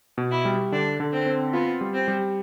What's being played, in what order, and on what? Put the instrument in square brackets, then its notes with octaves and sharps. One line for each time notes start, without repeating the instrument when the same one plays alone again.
[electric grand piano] B2
[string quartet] E4
[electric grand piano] G3
[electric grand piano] D3 [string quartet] D4
[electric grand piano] D3
[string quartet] C4
[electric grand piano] C4
[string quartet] B3 [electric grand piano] F4
[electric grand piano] G3
[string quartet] C4
[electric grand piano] G3